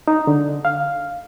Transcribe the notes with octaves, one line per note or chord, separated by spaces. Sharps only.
D#4
D3
F5